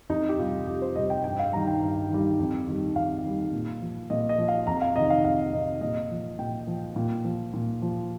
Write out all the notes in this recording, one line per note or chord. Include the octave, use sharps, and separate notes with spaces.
F2 D#4
G4
C3 G3 F4
F2 G4
C5
C3 G3 D#5
G5
G2 G5
F5
D#3 G3 A#5
G5
G2
D#3 G3
F2
D#3 G3
F2 F5
D#3 G3
A#2
F3
A#2 D#5
D#5
F3
F5
F2 A#5
F5
C3 D#3 D#5
F5
F2 F5
C3 D#3 D#5
A#2 D#5
F3
A#2 G5
F3
A#2
F3
A#2
F3